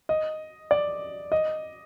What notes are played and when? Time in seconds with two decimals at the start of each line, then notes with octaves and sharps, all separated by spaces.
0.09 D#5
0.71 D5
1.32 D#5